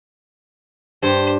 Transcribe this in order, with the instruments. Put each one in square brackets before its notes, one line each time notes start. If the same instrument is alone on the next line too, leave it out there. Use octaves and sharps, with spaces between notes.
[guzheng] G2 [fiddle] G4 C5